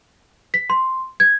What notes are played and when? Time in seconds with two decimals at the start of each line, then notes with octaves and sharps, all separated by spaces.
0.54 B6
0.70 C6
1.20 G#6